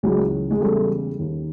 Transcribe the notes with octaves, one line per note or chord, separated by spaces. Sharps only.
C#2 C#3 E3 F#3 G#3
G#3
E2 C#3 E3 G3 A3
D#2 D#3